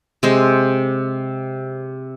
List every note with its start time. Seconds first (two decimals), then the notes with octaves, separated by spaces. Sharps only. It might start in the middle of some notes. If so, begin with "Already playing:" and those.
0.23 C3 G#3 C5